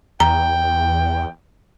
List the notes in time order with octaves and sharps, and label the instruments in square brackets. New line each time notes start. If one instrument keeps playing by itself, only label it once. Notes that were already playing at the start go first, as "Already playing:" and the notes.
[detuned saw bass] E2 [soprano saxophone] G5 [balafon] A#5